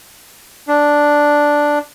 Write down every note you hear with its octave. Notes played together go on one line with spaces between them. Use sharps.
D4